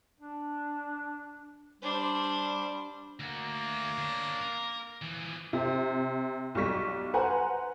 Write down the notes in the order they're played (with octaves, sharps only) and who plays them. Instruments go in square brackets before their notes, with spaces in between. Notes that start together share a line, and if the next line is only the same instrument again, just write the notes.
[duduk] D4
[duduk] G3 [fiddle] D4 C5
[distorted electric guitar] D2 F#4 [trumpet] A#3
[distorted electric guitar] D4 C#5
A#4
E3 F3
[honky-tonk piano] C3
B1 G3 C#6 B6
B4 C5 F#5 G#5 A#5